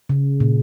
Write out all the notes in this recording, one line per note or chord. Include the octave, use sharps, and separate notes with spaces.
C#3
A#2